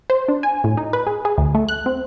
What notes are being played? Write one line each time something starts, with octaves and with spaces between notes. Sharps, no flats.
C5
D4
G#5
A2
D#4
B4
G#4
G#4
D2
A3
F#6
C4